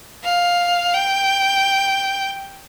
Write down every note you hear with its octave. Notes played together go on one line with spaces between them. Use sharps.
F5
G5